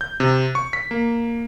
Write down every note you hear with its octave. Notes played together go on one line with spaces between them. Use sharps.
G6
C3
C#6
B6
A#3